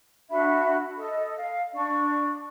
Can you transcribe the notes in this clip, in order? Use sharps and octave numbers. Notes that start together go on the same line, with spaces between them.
D4 F#4 E5 B5
A4 D#5
F5
D4 D5 C#6